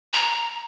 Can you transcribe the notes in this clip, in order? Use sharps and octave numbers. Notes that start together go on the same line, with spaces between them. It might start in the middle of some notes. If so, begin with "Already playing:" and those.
A#5